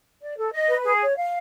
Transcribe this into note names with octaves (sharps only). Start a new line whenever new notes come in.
D5
A4
D#5
B4
G#4
C#5
F5